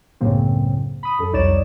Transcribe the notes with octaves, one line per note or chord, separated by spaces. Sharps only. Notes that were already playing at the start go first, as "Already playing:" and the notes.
C#2 F#2 A2 C#3 A#3 C4
B5 D#6
F#2 A4
C2 F2 D#4 C#5 D5 E7